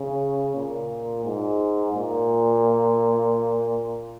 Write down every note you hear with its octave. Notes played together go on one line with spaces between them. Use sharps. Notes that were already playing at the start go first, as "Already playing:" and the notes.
Already playing: C#3
A#2
G#2
A#2